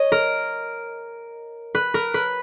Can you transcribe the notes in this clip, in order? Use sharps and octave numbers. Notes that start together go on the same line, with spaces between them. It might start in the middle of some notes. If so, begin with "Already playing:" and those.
Already playing: C#5 D#5
A#4
B4
A#4
B4